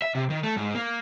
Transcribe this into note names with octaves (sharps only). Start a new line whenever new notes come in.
E5
C3
D#3
A3
G#2
A#3